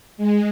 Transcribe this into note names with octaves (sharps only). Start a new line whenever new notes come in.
G#3